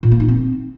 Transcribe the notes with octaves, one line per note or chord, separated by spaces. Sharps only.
A#2
A#3
D#4
C4